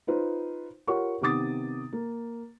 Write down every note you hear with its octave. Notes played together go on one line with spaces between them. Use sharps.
D#4 F4 B4 C5
F4 G4 A#4 C#5 F#5 C#6
C3 D#3 B3 D6 D#6 A6
A#3